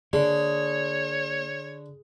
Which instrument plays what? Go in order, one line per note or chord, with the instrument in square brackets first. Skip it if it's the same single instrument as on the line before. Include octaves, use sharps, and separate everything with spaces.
[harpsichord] D3 [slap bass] A#3 [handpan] G#4 [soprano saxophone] C#5